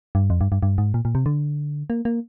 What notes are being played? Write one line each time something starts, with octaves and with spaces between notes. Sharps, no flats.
G2
F2
G2
G2
G2
G#2
A#2
A#2
C3
D3
A#3
A#3